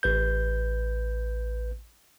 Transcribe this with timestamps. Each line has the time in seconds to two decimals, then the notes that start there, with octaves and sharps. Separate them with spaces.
0.03 A1 B4 G6